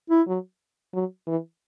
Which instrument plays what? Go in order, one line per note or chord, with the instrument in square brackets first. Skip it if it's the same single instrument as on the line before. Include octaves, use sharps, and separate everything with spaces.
[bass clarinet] E4
[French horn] F#3
F#3
E3